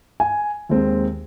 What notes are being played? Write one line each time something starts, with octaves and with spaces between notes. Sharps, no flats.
G#5
D#2 D#3 G#3 C4